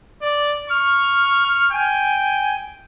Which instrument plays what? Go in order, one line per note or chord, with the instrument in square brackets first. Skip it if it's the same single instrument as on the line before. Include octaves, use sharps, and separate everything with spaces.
[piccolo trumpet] D5
[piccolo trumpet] C#6 [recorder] F6
[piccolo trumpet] G5 [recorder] G#5